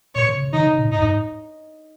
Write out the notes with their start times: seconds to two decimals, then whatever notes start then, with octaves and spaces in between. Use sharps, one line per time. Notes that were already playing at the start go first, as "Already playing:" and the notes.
0.15 A#2 C#5
0.29 C#3
0.42 C#3
0.53 D#3 D#4
0.67 C#3
0.78 A#2
0.91 G#2 D#4
1.00 F2
1.05 G#2